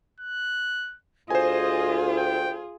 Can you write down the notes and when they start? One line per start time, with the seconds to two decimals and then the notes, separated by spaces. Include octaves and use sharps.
0.20 F#6
1.30 D2 F4 G#4 C5 D#5 G#5
2.18 G5